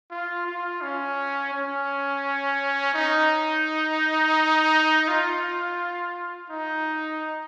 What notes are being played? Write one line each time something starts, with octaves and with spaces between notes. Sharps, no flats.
F4
F4
C#4
C#4
D#4
F4
D#4